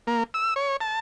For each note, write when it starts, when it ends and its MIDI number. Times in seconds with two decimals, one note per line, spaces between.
0.07 0.23 58
0.34 0.54 88
0.56 0.77 73
0.81 1.00 81